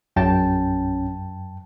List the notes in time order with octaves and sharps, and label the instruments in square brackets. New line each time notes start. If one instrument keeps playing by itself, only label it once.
[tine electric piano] A#1 C#4 [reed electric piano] F#2 G5 A5